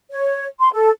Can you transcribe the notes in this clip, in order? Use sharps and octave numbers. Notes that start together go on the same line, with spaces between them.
C#5
C6
A4